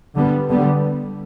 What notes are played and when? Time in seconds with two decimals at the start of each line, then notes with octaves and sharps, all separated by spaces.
0.15 D3 G3 B3
0.50 D3 G3 B3